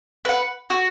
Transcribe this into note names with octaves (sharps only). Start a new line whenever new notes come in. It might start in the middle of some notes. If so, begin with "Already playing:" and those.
B4 F#5
F#4